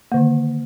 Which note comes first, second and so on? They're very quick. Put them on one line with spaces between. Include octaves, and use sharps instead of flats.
A#3 D3 D#3